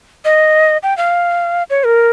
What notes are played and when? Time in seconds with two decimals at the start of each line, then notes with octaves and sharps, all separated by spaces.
0.25 D#5
0.83 G5
0.97 F5
1.70 C#5
1.85 A#4